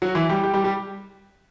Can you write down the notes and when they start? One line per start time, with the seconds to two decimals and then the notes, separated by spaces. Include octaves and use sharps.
0.02 F#3 F#4
0.15 E3 E4
0.29 G3 G4
0.43 G3 G4
0.54 G3 G4
0.64 G3 G4